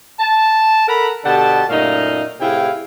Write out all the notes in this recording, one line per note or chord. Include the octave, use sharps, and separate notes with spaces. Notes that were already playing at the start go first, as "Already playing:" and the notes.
A5
A4 A#4 F#5 A#5 B5
B2 D3 G4 F#5 A5
F#2 A#2 A3 D#4 D#5 F5
A2 C3 E4 G#4 F5 G5